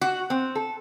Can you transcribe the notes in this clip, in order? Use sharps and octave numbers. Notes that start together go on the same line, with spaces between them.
F#4
C4
A4